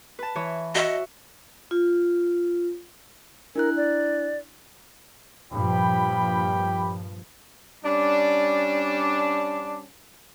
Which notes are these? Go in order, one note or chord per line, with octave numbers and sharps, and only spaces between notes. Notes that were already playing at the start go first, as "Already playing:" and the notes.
B4 A5
E3 C#5
F#4 D#5 E5 C#6
F4
D4 E4 A#4 F#6
D5
G2 A#2 F3 G4 G5 B5
G3 C#4 D4